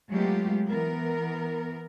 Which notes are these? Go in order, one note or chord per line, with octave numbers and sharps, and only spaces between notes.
F#3 G#3 A3 B3 F4 G4
E3 B3 A#4